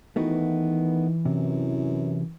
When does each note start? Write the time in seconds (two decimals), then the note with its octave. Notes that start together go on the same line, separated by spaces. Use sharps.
0.16 D#3 E3 A3 B3 F#4
1.25 F#2 C3